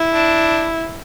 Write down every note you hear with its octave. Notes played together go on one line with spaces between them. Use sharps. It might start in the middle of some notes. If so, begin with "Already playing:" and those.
Already playing: E4
D4